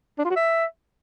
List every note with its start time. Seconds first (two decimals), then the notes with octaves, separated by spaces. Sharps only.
0.19 D4
0.24 F4
0.30 F#4
0.36 E5